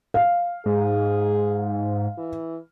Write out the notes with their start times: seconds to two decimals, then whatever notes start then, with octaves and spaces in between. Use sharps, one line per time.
0.14 F5
0.66 G#2 G#4
2.18 E3